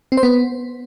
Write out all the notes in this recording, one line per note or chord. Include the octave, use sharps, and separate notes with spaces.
C4
C5
B3